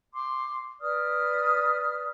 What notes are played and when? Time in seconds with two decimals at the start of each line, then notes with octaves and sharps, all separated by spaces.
0.14 C6 D6
0.80 B4 D5 D#6 F6